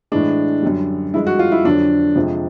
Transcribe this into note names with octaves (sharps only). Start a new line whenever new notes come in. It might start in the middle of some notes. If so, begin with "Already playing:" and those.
A2 E3 G#3 D4
F#2 D3 G3
G2 D3 F3 G#3 E4
F#4
F4
E4
F2 D3 F#3 D4
F2 C3 F3 G#3